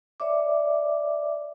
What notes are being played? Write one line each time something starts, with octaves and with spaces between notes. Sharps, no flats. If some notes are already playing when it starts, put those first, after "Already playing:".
C#5 D5 E5 D6